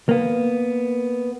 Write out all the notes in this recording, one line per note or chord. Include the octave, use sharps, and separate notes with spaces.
A#3 B3